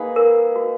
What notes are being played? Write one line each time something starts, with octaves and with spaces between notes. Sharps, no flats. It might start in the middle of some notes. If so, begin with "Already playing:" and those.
Already playing: A#3 D#4 G#4 B4
A#4
F#4